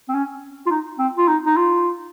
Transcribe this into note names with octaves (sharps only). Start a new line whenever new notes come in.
C4
C#4
F4
D#4
C4
F4
D#4
D#4
F4